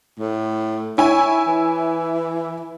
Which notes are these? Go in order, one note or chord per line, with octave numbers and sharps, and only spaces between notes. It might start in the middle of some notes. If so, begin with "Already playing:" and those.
A2
E4 C#5 G#5
E3